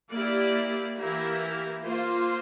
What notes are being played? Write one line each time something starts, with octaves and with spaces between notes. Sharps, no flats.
A#3 E4 G4 D5
E3 A#3 E4 G4 A#4
A#3 F4 C5